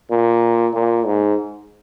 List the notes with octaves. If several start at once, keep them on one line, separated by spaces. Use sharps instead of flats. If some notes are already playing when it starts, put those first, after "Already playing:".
A#2
A#2
G#2